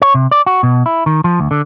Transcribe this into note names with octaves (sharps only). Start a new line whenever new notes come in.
C#5
C3
D5
F#4
B2
E4
D#3
F3
D2
D3